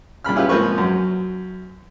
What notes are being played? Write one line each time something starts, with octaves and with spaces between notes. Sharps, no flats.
G2 A#2 B5 F6
C#4 E4 F4 G4 B4
G#2 F3 A#3 C4 B4 C#6
F#2